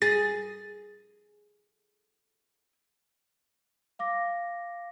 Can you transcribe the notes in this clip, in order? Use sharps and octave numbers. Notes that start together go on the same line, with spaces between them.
G#4 A6
F5 D6 A#6